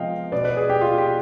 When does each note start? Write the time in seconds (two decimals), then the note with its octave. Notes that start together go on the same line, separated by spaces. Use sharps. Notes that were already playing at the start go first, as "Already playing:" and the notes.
Already playing: C3 F3 G#3 B3 D#5 F5 G5
0.32 B2 B3 D5
0.45 B4
0.57 G#4
0.70 G4
0.81 F4
0.98 G4